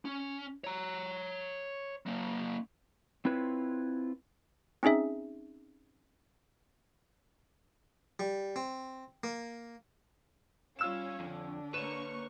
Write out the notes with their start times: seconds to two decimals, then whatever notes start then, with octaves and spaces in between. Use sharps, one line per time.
0.05 C#4
0.64 C#5 A#5
2.06 F#3 A#3
3.25 C4 E4 F4 B4 C#5
4.83 C4 C#4 D#4 G#4 E5
8.20 G3
8.56 C4
9.24 A#3
10.79 G3 C#4 F4 F5 E6 E7
11.20 F2 D3 D4
11.74 A#3 B4 C#5 C#6 E7